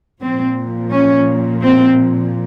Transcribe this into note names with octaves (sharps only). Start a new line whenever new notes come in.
A#2 F3 C4
C#4
C4